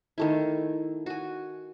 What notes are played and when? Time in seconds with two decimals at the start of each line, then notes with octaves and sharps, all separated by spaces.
0.18 D#3 A3 E4
1.06 F#4 G#5